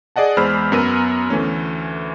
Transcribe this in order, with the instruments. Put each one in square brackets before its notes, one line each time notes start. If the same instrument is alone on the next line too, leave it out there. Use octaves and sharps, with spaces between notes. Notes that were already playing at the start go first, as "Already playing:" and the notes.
[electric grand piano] G#4 D5 D#5 F#5 A5
E2 G#3 C5 B5 E6 F6
F#2 B3 A#4 E6 D#7
D2 E3 A3 C#4